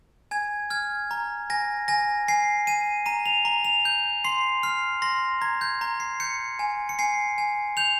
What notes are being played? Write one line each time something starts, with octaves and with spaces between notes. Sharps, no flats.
G#5 G#6
F6 G#6
A#5
G#5 A#6
G#5 A#6
G#5 C7
G#5 D#7
A#5 D#7
F7
A#5
F7
G6
C6 C7
F6 C7
C6 A#6
A#5 G#6
G6
A#5
C7
G6 C#7
G#5
C#7
G#5 C7
G#5
G6 F7